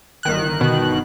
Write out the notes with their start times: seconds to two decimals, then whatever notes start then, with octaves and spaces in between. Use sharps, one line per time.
0.23 G1 D#3 F#6
0.61 B2